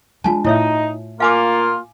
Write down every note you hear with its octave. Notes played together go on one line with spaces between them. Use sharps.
G#3 D4 F4 G#5 A5
A2 D#4 E4 C#5 E5
A#3 F4 F5 G#5 D6